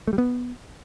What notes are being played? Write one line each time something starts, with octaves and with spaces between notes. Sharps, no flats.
A3
G3
B3